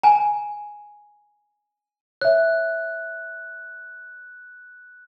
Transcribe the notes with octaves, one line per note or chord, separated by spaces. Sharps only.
G#5 A#5
C#5 E5 F#6